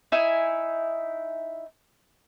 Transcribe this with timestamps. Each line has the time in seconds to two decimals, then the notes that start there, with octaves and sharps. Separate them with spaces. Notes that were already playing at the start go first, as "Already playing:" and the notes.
0.12 D#4 E4 E5 G#5